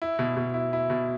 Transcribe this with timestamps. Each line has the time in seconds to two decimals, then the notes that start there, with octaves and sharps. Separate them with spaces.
0.02 E4
0.19 B2
0.37 B2
0.54 E4
0.73 E4
0.90 B2